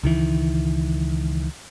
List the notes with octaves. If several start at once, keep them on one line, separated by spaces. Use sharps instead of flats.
C#2 D#3 E3